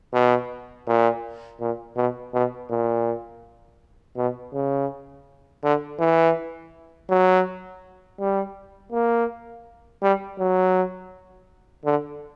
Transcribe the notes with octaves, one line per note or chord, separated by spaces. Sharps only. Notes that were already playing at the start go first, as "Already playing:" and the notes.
B2
A#2
A#2
B2
B2
A#2
B2
C#3
D3
E3
F#3
G3
A#3
G3
F#3
D3